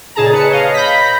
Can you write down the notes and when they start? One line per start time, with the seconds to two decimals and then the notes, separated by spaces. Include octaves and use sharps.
0.15 A#2 C#3 D#4 G#4 A5 A#5
0.33 B4 C#7
0.50 C#5 D#5 F5
0.74 B5 G6 A#6 B6